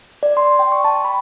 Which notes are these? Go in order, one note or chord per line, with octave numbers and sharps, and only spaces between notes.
D5
C6
G5
C#6
A5
B5